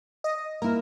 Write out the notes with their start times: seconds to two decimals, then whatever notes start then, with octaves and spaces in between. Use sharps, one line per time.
0.24 D#5
0.62 A#3 E4 A#4